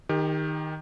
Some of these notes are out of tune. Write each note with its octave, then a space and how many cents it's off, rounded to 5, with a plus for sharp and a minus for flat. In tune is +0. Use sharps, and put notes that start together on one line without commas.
D#3 +0 G4 +30